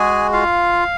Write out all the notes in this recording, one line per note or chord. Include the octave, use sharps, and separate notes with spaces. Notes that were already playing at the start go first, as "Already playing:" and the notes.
Already playing: G#3 F#4 G#4 G#5
F4 F5